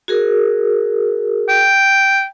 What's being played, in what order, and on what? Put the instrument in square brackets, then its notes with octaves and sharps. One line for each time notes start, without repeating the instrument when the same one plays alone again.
[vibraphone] F#4 G#4 A#4
[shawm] G5